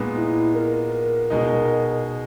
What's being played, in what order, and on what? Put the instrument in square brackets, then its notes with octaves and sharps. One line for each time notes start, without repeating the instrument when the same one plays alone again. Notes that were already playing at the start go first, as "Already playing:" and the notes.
Already playing: [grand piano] A#2 G#3 B3 D#4
[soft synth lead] E4
A#4
[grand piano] B2 G#3 D#4